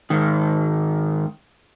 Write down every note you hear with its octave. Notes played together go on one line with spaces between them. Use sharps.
G#2 D#3